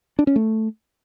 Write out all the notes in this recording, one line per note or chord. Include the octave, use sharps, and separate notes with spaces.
D4
C#4
A3